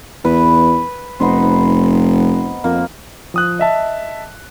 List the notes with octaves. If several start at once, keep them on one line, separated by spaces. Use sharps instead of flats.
E2 B4
F1 B3 D#4 C5
F2 A#3
F3 D#6 F#6
D#5 E5 A5